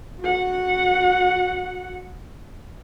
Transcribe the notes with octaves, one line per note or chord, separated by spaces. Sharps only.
F#4 F#5